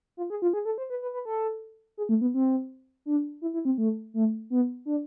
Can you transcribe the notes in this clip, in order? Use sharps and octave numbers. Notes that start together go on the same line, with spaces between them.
F4
G#4
F4
G#4
A4
C5
B4
B4
B4
A4
G#4
A3
B3
C4
D4
E4
E4
C4
A3
A3
B3
D4